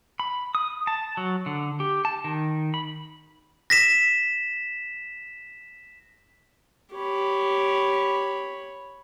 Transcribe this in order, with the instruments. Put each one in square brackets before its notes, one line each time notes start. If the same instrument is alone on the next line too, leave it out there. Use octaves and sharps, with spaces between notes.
[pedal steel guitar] B5
D#6
A5
F#3
D3
G4
A5
D#3
B5
[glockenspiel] A#6 B6 E7
[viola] G4 [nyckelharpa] C#5 B5